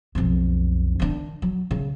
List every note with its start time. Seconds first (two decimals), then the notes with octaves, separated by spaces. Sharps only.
0.15 B1 F2
1.00 D#3 D4
1.42 F#3
1.71 C#3